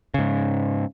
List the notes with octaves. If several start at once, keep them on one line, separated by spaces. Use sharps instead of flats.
G#2 C#3